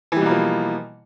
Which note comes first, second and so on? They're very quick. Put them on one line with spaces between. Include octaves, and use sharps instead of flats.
E3 G3 B2 A#3 F3